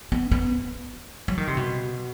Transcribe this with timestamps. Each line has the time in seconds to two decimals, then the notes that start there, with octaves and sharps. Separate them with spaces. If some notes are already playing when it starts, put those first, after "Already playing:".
0.12 B3
0.31 B3
1.28 F#3
1.38 D#3
1.47 C3
1.57 B2